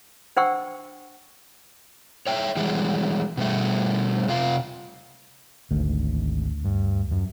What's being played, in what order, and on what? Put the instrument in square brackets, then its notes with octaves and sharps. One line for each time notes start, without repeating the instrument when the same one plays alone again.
[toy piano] D4 C5 F#5 G5 C#6 E6
[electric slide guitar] C#5 E5 G5
E3 G3 G#3
B2 G3 A3
C3 F4 F5
[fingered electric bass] G#1 [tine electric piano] D2
[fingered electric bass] G2
F#2